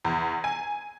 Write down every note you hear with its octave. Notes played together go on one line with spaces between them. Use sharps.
E2
G#5